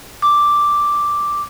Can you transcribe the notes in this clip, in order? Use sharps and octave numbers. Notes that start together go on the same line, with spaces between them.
D6